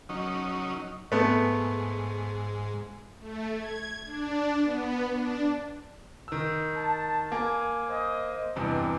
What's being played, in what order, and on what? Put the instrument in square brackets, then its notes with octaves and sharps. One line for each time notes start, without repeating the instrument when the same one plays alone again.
[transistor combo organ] F#3 C#4 D#4
[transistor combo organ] G#2 [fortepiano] A3 B3
[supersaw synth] A3
G#6
D4
B3
D4
[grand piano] D#3 E6
[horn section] A5
[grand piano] A#3 [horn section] G#5
[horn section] C5 D#5
[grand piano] E2 G2 C3 [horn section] G3 D#5